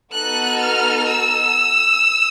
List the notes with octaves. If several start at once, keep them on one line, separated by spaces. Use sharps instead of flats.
B3 D#4 F#4 A4 F#6
F6
E6